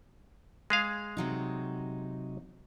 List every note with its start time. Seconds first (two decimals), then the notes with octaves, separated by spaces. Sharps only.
0.70 G#3 G#4 F5
1.17 C3 F#3 D#4